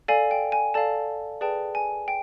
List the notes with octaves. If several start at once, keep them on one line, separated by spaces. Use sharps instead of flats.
A4 D5 F5 G#5
G5
G#5
A4 D5 F5 A5
G#4 B4 D5 G5 A5
G#5
G5